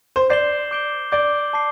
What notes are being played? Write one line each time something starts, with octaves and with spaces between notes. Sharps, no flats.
C5
D5 G6 C7 E7 G7
D6 G6 D7 G7
D5 D6 G6 D7 G7
A5 D6 C7